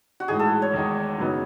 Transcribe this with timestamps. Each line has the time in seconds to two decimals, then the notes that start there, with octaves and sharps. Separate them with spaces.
0.20 F#4
0.28 A2 E3 G#3 D#4 G#4
0.39 A4
0.62 C#5
0.73 E2 D#3 G#3 D#4
1.19 F#2 C#3 F#3 B3 D#4